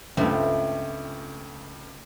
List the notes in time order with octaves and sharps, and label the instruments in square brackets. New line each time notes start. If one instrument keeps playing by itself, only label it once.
[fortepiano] C#2 G2 [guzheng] A3 C4 F4